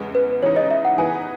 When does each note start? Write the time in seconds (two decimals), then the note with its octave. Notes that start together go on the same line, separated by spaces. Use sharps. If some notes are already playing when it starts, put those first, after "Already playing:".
Already playing: E2 C#3 G#3 B3
0.15 B4
0.43 C#3 E3 G#3 D#4 C#5
0.56 D#5
0.71 E5
0.85 F#5
0.98 E3 B3 D#4 G#4 B4 G#5